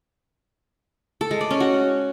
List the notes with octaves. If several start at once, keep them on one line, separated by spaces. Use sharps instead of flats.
A4
G#3
D5
C#4
F#4